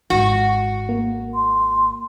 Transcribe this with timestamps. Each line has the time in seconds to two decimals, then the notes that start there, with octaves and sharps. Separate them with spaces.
0.10 G#1 F#4
0.89 A#3
1.34 C6